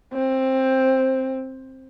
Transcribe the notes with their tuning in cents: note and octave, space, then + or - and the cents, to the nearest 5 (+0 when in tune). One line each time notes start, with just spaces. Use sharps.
C4 +10